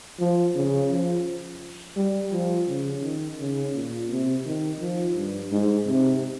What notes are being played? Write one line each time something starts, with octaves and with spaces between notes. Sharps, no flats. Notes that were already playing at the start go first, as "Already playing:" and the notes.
F3
C#3
F3
G3
F3
C#3
D#3
C#3
A#2
C3
D#3
F3
G2
G#2
C3